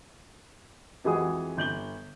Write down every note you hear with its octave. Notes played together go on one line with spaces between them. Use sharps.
F2 E3 G#3 F#4 G#4 D#6
G1 G6 F#7 G7